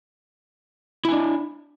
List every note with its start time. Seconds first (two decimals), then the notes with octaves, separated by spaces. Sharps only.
1.05 E4
1.09 G#5
1.12 D4